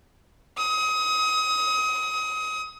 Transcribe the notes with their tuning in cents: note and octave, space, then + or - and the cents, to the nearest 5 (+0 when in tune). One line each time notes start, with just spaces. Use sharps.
D#6 +30